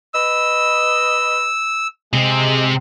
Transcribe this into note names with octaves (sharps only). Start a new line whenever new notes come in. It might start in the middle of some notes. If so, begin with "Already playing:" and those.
B4 D#5 E6
C3 G#3 C4